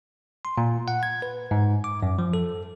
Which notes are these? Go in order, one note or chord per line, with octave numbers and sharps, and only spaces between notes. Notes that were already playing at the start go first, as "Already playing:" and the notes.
C6
A#2
F#5
G#6
B4
G#2
D6
F#2
F3
A4